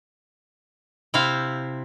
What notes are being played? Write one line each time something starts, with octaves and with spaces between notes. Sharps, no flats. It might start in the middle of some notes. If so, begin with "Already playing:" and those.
C3 E4 C5 F5